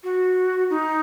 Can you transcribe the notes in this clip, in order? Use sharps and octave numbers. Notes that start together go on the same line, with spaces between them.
F#4
D#4